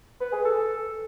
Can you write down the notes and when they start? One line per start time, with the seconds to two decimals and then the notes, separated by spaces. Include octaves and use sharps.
0.21 B4
0.33 G#4
0.45 A4